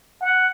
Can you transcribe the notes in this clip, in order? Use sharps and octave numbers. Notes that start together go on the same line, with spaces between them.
F#5